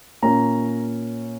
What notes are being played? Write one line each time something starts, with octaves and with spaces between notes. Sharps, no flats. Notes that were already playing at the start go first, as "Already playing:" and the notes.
A#2 A#3 C#4 A#5